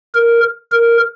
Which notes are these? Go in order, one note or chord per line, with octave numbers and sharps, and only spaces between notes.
A#4
A#4